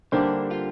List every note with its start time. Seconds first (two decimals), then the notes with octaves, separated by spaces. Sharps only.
0.12 D3 G3 A#3 D4 G4 C5
0.51 F4